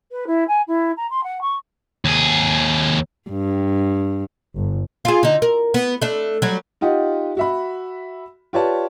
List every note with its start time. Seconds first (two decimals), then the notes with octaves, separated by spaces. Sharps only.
0.11 B4
0.27 E4
0.48 G#5
0.67 E4
0.97 A#5
1.10 C6
1.24 F#5
1.41 C#6
2.05 D#2 G#4
3.29 G2
4.56 G1
5.05 F4 G#4
5.23 D3 D#4
5.42 A#4
5.74 B3
6.02 A3 D4
6.42 F#3 G3
6.81 D#4 F4 G4 D#5 F#5
7.37 F#4 E5 B5
8.53 F4 G4 B4 C#5 D5 A5